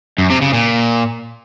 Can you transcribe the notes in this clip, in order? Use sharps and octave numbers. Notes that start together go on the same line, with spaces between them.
F#2
C3
C#3
A#2